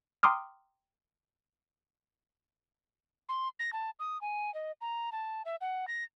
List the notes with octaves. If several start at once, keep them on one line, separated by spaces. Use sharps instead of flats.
G5 A#5 C6 D6 D#6 F6
C6
A#6
A5
D#6
G#5
D#5
A#5
A5
E5
F#5
A#6